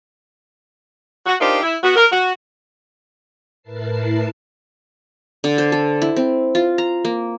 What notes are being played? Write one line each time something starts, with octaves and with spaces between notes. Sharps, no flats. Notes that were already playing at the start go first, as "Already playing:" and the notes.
F#4
D4 D#4 F4 G4 A#4 C5
E4
B3 F#4
A#4
F#4
A2 E4 A#4 B4 A5 C7
D3
C5
A4
E4
C4
F4
A#5
A#3